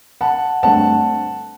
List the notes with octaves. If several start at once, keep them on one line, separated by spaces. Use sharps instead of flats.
F#5 A5
G2 D3 A3 C4 F#5 A5